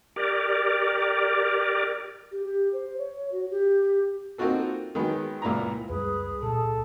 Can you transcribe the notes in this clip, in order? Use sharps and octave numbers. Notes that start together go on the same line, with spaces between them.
G4 A#4 D5
G4
G4
C5
C#5
F#4
G4
A#3 C4 D#4 F4 F#4 A4
D#3 F#3 G#3 B3
C#2 A#2 E4 A#5
C#2 F#2 G3 G#4 B4
C#2 A#2 A4